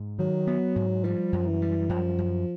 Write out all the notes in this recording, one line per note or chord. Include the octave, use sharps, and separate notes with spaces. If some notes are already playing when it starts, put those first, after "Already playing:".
Already playing: G#2
D#3 F#3
B3
G#2
F3 G3
F#2
E3
G3
F#2 F3
F#2